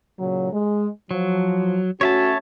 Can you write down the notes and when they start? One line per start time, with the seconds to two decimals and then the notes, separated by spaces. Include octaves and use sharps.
0.19 A#2 C#3 F#3
0.53 G#3
1.11 F3 F#3
2.01 A3 C#4 F#4 C#5 E5 A5